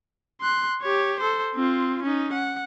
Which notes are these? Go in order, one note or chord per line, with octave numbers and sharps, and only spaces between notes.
C6 F#6
G4 C#5
A4 C5
C4 F4
C#4 D#4
F#5